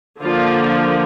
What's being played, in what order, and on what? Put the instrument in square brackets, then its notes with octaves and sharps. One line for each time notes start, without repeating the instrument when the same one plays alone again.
[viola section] D3 F3 A#3 D4 F4